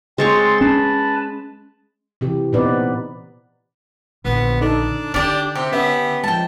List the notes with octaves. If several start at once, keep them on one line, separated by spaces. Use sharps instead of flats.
G#3 C4 C#5 C6 C#6 A6
C#4 B4 A5
C3 E3 G4
A#2 B3 C4 D#4 B4 D5
A#1 D3 B3
D4 D#4 A4
D3 D4 G4 D5
C3 G4
B3 C#4 E5
F3 G#3 G5 A5